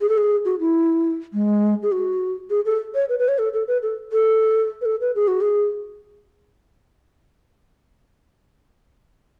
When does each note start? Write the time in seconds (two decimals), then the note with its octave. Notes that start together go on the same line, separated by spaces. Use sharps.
0.01 G#4
0.09 A4
0.18 G#4
0.45 F#4
0.60 E4
1.33 G#3
1.83 G#4
1.92 F#4
2.50 G#4
2.65 A4
2.95 C#5
3.09 B4
3.19 B4
3.28 C#5
3.39 A4
3.53 A4
3.68 B4
3.83 A4
4.12 A4
4.81 B4
4.85 A4
5.01 B4
5.15 G#4
5.28 F#4
5.41 G#4